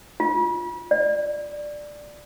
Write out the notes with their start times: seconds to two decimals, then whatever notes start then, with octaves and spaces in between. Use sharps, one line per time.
0.20 F4
0.91 D5